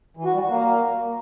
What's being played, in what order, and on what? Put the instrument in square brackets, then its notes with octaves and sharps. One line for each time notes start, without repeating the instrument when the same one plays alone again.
[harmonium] E3
F#4
G3
F#4
A#3